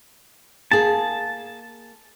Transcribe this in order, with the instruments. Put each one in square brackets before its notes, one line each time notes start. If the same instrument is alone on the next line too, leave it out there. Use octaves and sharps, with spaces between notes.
[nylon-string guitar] A#3 G#4 [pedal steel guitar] A5